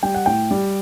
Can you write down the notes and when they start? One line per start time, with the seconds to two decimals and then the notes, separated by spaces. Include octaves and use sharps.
0.03 G3 G5
0.14 F#5
0.26 A2 G5
0.51 G3